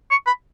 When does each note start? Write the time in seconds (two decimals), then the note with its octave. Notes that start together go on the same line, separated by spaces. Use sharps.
0.11 C#6
0.27 B5